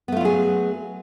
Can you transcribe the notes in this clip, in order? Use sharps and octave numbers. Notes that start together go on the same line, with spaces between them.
F#3 A3 B3 F4 G#4